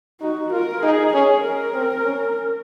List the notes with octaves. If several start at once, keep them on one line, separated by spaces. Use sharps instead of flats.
D#4 F#4
F4 A#4
D#4 G#4
C#4 G#4
A#4
C4
C#4